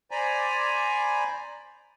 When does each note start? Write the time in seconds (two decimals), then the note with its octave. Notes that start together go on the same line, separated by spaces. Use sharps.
0.11 C5 D5 G#5 A#5 B5